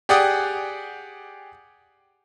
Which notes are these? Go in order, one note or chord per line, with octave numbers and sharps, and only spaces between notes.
G4 G#4 D5 F#5 G5 D#6